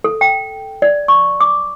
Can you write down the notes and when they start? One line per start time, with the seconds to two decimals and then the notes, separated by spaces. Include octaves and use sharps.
0.04 A4
0.21 G5
0.82 D5
1.08 C#6
1.41 D6